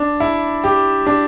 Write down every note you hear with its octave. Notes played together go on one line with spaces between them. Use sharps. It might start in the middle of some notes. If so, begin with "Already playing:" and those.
Already playing: D4
E4
G4
D4